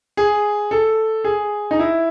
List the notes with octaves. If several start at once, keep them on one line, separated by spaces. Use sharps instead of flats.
G#4
A4
G#4
D#4
E4